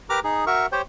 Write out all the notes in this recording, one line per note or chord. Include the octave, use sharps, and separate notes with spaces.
G4 A#4 B4 A#5 D6 F6
D#4 G#4
F#4 A#4 E5 C#6
G4 C5 C#5 G5